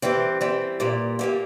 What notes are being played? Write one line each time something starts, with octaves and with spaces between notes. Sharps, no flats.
E3 G3 C4
E3 G3 C4
A#2 G3 A#3
A#2 G3 A#3